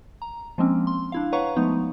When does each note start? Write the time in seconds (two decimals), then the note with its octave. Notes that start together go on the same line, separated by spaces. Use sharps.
0.22 A#5
0.58 F3 G#3 A#3 C4 C#4
0.87 C6
1.12 D4 E4 F5
1.33 B4 C#5 F5 F#5 A#5 C#6
1.57 F3 G#3 A3 B3 D#4